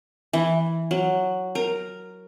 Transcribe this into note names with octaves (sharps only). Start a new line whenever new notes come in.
E3
F#3
A#4